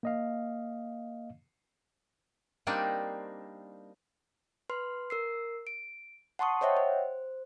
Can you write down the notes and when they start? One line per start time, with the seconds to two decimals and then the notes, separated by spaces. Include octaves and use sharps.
0.03 A#3 D#5 F5
2.67 G3 A#3 C4 D4 D#4
4.70 B4 C6 F6
5.10 A#4 E6 C7
5.67 D7
6.39 F#5 A5 C6 C#6 D#6
6.61 C5 C#5 D#5 E5 F#5 G5
6.77 C5